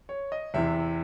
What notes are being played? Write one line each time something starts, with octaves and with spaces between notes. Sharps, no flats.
C#5
D#5
E2 C3 E3 E5